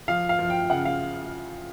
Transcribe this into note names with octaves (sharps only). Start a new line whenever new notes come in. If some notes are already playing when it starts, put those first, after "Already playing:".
F3 F5
F5
F3
G5
C#3 F#5
F5